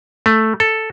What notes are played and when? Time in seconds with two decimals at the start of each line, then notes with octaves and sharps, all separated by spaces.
0.26 A3
0.60 A4